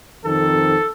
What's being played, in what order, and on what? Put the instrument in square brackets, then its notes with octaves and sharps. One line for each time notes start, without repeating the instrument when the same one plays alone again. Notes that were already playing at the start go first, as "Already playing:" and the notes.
[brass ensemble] F2 C3 D#3 [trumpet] A4